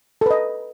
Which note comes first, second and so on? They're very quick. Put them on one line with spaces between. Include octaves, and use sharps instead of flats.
A4 B4 D#5